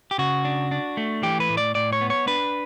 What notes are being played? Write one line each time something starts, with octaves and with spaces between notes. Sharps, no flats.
G4
C#3 F#4
D4
D4
A3
E3 G4
B4
A2
D5
A2 D5
C#5
B3
C#5
D4 B4